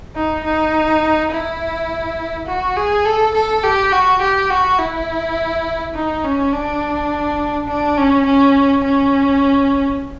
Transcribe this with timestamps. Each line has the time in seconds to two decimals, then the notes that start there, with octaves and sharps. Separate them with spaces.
0.16 D#4
0.44 D#4
1.32 E4
2.47 F#4
2.76 G#4
3.05 A4
3.34 A4
3.63 G4
3.92 F#4
4.22 G4
4.50 F#4
4.79 E4
5.95 D#4
6.24 C#4
6.53 D4
7.68 D4
7.97 C#4
8.26 C#4
8.84 C#4